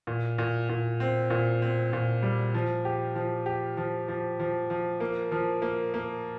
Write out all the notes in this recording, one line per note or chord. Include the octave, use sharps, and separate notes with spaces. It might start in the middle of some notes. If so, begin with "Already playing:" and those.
A#2
A#2
A#2
C4
A#2
C4
A#2
G3
F3
G4
F3
G4
F3
F3
F3
F3
A#3
F3
A#3
A#3